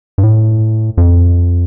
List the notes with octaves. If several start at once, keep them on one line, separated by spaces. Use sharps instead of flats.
G2
A2
F2